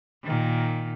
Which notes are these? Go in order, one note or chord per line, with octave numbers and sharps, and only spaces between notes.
A#2 D#3